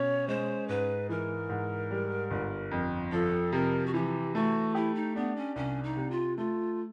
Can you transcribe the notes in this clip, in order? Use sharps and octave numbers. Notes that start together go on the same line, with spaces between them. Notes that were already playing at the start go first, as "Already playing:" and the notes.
Already playing: B2 C#4 C#5
G#3 C5
G#2 B4
E3 A#4
G#2
G3
G1
F2
F3 A4
C3 A#4
F#4
E3 G4
A3 F#4
E4 G4
D#4
B3 D4
C#4
C2 C#4
D#4
C3
F4
A3 F4